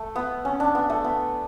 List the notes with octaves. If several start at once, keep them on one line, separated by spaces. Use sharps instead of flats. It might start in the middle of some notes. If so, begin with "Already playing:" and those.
Already playing: A3
B3
C#4
D4
B3
A3
B3